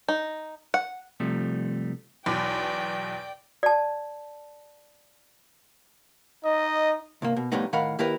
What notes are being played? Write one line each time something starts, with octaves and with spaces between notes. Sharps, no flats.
D#4
F#5
C3 F3 G3 A3
B1 E2 D5 G5 D6
D5 A5
D#4 D#5
C2 G2 A#3
B2
F2 A2 G3 A3 B3 D#4
A2 D#3 A#4 F5 F#5 B5
D#2 E4 G4 A#4 B4